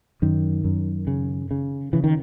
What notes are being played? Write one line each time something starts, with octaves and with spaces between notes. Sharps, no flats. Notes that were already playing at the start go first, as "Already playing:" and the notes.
F#2 D#3
F#2
C#3
C#3
C#3 E3
D#3